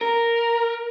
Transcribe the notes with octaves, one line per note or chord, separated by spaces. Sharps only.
A#4